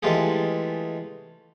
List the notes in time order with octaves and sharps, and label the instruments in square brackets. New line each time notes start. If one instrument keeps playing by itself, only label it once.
[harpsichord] E3 G#3 A3 F4 G4 G#4